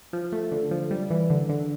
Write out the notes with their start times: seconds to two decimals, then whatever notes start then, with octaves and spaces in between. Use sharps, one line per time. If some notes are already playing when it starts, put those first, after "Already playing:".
0.13 F3
0.32 A3
0.52 D3
0.71 F3
0.91 G3
1.10 E3
1.30 D3
1.49 D3